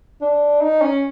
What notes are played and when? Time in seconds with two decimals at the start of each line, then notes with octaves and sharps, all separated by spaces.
0.21 D4
0.61 D#4
0.81 C#4